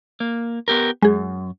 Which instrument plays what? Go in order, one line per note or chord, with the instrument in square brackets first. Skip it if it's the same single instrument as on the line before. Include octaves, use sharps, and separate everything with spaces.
[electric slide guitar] A#3
B3 G4 A#4
[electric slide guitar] F#2 [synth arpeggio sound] G#3 G#4